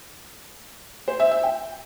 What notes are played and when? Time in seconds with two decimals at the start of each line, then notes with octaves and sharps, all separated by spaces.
1.08 C5
1.20 E5
1.31 E5
1.43 G5